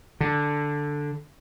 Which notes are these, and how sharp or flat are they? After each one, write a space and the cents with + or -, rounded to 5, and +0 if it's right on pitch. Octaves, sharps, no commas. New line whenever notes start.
D3 +0